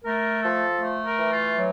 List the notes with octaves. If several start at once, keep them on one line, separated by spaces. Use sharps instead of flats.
A3 A#4
F3 A4
A3
A#4
E3
F4
F#3